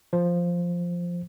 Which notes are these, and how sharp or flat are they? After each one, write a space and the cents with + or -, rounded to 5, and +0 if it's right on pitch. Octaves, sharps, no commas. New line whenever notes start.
F3 +0 C5 +0